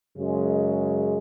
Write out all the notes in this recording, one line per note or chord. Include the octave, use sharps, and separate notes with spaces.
F#2 C#3 G#3